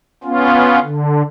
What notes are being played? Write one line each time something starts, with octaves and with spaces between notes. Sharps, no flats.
B3 C#4 F4
D3